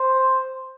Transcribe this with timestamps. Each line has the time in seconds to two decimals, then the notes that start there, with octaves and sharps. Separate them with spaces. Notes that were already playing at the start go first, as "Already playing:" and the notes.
Already playing: C5